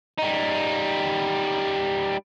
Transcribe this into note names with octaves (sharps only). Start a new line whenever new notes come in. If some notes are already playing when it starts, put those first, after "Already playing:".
G3 D#4